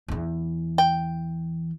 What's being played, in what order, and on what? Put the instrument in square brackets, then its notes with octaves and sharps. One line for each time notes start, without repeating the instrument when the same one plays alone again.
[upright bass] E2 E3
[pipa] G5